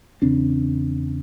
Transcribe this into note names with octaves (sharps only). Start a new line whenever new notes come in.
E2 C#3 C4 D4